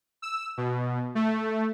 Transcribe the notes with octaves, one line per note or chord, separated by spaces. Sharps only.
E6
B2
A3